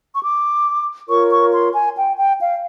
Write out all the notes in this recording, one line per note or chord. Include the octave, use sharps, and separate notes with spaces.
C#6
D6
F4 A#4 C#5 C#6
C#6
C6
G#5
G5
G5
F5